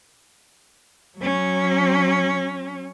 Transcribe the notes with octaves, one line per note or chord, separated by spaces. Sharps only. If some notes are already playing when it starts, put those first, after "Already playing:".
F#3 C#4